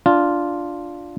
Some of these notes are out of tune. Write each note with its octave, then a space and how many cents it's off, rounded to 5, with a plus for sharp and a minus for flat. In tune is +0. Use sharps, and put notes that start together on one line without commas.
D4 +0 F4 +0